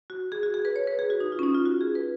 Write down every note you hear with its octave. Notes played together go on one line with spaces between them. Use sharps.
F#4
G#4
F#4
G#4
B4
C#5
B4
G#4
F#4
D#4
F4
C#4
D#4
F4
F#4
G#4
B4